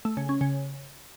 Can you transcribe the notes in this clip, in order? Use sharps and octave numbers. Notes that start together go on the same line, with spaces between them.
A3
C#3
C#4
C#3